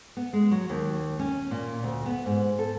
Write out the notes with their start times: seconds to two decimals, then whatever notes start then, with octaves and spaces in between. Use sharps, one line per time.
0.17 B3
0.33 G#3
0.51 F#3
0.70 D#2
1.19 C#4
1.51 A#2
1.83 D2
2.06 B3
2.26 G#2
2.59 A4